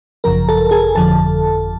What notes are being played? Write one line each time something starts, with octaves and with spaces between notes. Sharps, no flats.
G#1 F#2 C#3 F3 A#4 A#5
A4 A5
G#4 G#5
G1 F2 D3 F3 A4 A5